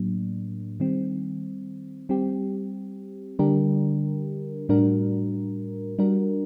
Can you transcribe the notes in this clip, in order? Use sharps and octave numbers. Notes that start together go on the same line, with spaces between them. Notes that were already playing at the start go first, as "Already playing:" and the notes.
Already playing: A2 F#3 A#3 D4
D#3 G3 C4
G3 C4 G4
D3 G3 D4 G4 A#4
A2 G3 D4 F#4 A#4
G3 D4 F#4 A#4